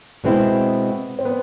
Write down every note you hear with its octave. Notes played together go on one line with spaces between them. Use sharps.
B2 G#3 B3 C4 E4
C4
B3